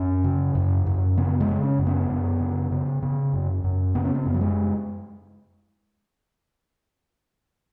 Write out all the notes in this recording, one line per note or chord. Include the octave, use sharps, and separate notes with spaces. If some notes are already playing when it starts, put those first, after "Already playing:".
Already playing: F#2 C#4
C#3
F#2
F#2
C#3 B3
G#3
C#3
C#4
F#2
B3
F#2
C#3
C#3
C#3
F#2
F#2
C#3 B3
C#4
B3
F#2
F#3
G#3